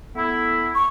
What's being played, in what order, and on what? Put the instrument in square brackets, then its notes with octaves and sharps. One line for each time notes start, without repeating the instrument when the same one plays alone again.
[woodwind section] A3 B3 E4
[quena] C#6